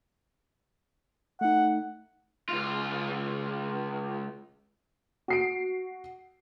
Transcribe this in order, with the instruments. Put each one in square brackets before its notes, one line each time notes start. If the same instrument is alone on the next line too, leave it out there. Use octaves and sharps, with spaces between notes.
[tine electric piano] A3 D#4 [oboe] F#5
[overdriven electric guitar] C#2 F4
[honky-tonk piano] F#4 C7 D7